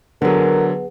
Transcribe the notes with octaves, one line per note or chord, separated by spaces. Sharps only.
D3 F#3 B3 G#4 A#4